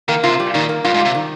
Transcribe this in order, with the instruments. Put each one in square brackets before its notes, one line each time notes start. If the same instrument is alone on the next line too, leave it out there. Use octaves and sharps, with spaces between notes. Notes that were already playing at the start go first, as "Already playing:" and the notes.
[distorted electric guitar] D#3 [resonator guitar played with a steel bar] A#3
[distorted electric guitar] C3 [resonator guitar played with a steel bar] F4
[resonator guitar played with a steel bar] G3
[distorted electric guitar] A#2 [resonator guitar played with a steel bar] D#3
[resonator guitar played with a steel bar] A#3
[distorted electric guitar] G2 [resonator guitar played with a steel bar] F4
[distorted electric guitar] G#2
[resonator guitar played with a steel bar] G3
[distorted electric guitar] C3
[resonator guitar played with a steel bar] D#3